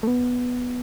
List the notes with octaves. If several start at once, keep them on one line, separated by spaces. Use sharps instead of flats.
A3
B3